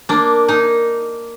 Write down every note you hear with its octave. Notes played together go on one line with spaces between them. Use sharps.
A#3 D4
A#3 D#4